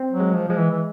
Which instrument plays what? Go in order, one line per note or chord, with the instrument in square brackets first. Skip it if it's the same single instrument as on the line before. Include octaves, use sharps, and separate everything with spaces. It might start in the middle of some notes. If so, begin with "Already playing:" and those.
Already playing: [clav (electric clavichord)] C4
[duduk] F#3
[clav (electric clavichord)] G#3
[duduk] F3
[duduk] F3 [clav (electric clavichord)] G#3
[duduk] E3
E3